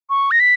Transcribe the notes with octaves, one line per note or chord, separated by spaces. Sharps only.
C#6
A#6
B6